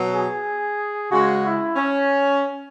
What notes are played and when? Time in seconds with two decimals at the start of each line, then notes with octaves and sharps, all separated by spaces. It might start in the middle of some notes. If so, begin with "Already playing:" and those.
Already playing: B2 F#3
0.12 G#4
1.10 C#3 G#3 F#4
1.44 E4
1.76 C#4